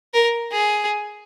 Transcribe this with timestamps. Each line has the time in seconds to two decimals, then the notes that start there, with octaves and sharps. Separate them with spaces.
0.14 A#4
0.52 G#4